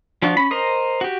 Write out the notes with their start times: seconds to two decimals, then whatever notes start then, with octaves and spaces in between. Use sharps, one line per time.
0.22 F3 D4 F4 F#4
0.36 C#4 B5
0.51 A#4 C5 D#5
1.01 F#4 G4